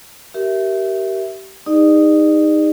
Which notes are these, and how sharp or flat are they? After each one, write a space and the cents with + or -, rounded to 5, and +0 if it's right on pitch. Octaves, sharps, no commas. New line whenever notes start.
G4 -25 A#4 +0 E5 +0
D#4 +0 G#4 -45 D5 +40